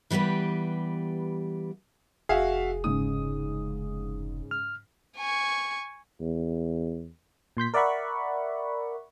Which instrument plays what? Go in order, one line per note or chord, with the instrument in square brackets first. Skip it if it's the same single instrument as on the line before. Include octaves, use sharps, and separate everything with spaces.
[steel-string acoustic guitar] E3 G3 B3 G4 B4
[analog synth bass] F1 [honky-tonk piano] F#4 E5 F5 [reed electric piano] G#4
[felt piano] G#2 C#3 [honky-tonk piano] D#6
[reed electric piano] F6
[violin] G#5 C#6
[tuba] E2
[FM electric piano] A#2 C6 G6 B6
A#4 D5 E5 F#5 B5 C#6